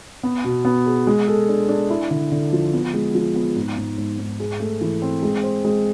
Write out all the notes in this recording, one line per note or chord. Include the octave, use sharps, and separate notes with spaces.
B3
B2
B3
G#4
G#3
A4
D4
D4
E4
D3
D3
F3
B3
G#3
F3
B3
G#2
G#2
G#2
G#2
G#4
A3
E3
C4
G#3
C5
G#3